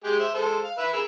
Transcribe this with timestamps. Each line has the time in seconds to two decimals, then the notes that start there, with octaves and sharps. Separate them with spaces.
0.04 G#3 G4 G#4
0.20 C5 E5
0.34 G#3 A4 C5
0.64 F5
0.78 B4 E5 B5
0.93 G#4 A#4 E6